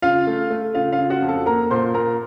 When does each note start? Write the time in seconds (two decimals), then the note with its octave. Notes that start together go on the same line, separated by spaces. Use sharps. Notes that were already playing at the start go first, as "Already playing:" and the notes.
0.02 C#3 F4 F5
0.27 A3
0.50 A3
0.75 C#3 F4 F5
0.92 F4 F5
0.98 C#3
1.10 F#4 F#5
1.22 F2
1.29 A4 A5
1.46 A#3 A#4 A#5
1.71 A#2 C5 C6
1.94 A#2 A#4 A#5